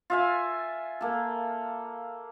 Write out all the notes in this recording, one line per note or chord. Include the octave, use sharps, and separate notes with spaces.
F4 E5 G#5
A#3 A4